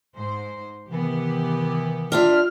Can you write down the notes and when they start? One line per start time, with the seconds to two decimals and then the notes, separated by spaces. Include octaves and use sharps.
0.16 G#2 C5
0.88 C3 D#3 E3 B3 G4
2.12 D4 F4 E5 F6